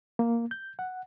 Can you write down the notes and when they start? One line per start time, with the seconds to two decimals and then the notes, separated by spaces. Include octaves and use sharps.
0.19 A#3
0.51 G6
0.79 F#5